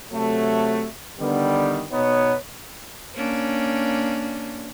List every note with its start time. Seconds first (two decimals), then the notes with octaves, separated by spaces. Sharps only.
0.12 C3 F#3 A3
1.20 D3 D#3 G3 B3
1.91 B2 B3 D#4 C#5
3.15 A#3 C#4 D4